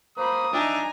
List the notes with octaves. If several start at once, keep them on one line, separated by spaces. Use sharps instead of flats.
A#3 C5 B5 D#6
D4 D#4 E5 G#5 A#5